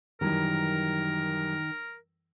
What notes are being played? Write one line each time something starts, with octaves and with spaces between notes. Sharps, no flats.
F#2 D#3 E3 G3 A#4